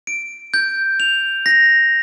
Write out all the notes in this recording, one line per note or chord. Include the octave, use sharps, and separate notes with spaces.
D7
G6
F7
A#6